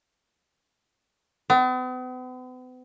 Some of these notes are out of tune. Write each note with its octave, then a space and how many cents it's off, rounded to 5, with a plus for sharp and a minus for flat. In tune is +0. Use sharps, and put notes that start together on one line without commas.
B3 +45